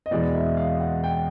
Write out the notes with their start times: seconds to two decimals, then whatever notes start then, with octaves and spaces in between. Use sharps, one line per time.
0.06 D#5
0.11 E2 B2 G#3 B3 D5
0.35 E5
0.57 F5
0.80 F#5
1.04 G5